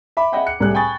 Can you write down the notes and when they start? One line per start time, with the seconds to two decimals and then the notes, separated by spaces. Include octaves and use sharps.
0.17 E5 B5 D6
0.32 G#4 D#5 E5 F#5 G5 B5
0.46 F#6 C#7
0.60 C2 A2 G3 A3 G#4 F#6
0.75 G5 G#5 B5 C#6 D#6 A6